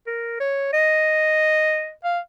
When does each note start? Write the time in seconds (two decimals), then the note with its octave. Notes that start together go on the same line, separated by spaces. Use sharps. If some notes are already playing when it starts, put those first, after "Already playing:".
0.07 A#4
0.40 C#5
0.73 D#5
2.04 F5